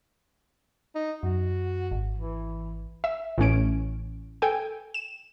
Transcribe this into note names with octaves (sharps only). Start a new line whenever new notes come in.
D#4
F#2 F#4
G#1
E3
E5
A1 A2 C#4 D7
A4 G5 G#5
E7